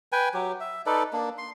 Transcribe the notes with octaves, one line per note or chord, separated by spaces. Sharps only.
B4 G5 G#5
F#3 G4
E5
D#4 A4 B4 D5
A#3 D4
C6